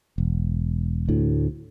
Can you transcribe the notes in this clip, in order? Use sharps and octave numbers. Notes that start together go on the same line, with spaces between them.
E1
D2 A2